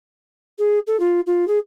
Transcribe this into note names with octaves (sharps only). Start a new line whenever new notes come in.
G#4
A4
F4
F4
G#4